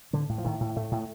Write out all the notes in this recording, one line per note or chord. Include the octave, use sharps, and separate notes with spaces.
A2 D3
A2
F3
A2 D#3
A2
A2 A3
A2